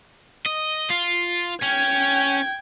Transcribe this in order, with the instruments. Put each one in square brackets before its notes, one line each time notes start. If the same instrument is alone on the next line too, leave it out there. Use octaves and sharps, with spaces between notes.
[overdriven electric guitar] D#5
F4
[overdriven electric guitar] C#4 [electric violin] G5 G#6